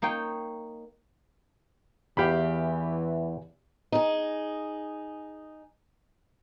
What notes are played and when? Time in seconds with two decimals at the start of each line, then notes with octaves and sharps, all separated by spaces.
0.02 A#3 D#4 C#5 G5
2.17 E2 E3 G4 F5 B5
3.92 D#4 G#4